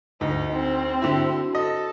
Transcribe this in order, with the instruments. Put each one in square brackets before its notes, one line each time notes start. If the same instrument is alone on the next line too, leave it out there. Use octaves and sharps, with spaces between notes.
[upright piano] D2 [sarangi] D#4
[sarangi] C4 [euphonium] D#4
[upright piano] D3 E4 [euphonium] F#4
[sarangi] A4 [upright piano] D#5